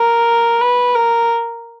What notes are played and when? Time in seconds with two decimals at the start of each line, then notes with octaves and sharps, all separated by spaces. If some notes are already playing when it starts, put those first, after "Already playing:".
Already playing: A#4
0.61 B4
0.95 A#4